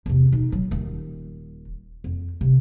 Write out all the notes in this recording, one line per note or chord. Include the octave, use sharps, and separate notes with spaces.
E2 C3
B2 D#4
F#3
D#1 D#3
F2
C3